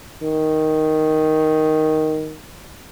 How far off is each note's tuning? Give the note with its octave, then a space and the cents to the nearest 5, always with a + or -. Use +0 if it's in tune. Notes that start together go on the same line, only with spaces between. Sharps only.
D#3 +5